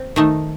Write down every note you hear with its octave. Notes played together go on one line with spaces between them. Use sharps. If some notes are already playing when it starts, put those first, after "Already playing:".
Already playing: C4
D#3 A3 D#4